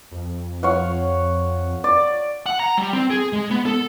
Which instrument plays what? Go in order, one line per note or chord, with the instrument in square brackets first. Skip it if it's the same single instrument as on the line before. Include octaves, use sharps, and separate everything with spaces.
[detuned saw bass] F2
[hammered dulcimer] C#5 F5 F#5
D5
[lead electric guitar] F#5
A#5
G3
C4
G#4
G#3
B3
A4